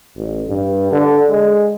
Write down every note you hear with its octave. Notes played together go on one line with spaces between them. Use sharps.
A1
G2
D3
G#3